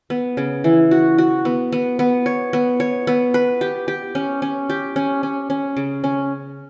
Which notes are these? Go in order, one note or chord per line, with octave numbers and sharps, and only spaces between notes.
B3
C#3
E3
F#4
F#4
B3
B3
B3
C#5
B3
C#5
B3
B4
G4
G4
C#4
C#4
G4
C#4
C#4
C#4
C#3
C#4